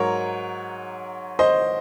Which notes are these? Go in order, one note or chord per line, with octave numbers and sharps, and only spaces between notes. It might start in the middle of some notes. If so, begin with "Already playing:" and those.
Already playing: G#2 F#3 A#4 C#5
C5 D#5